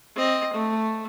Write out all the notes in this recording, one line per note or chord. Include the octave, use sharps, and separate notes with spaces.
C4 D#5
A3